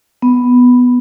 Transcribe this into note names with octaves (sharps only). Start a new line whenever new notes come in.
B3